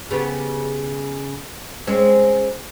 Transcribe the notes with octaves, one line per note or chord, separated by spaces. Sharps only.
C#3 B3 G4
G#3 C4 C#4